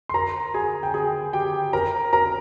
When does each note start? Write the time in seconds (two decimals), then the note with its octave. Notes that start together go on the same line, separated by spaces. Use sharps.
0.09 C6
0.14 A#4 A#5
0.54 G#4 G#5
0.83 G5
0.94 G#4 G#5
1.33 G4 G5
1.73 A#4 A#5
2.13 A#4 A#5